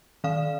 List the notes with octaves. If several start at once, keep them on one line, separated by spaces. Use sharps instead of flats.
D#3 F5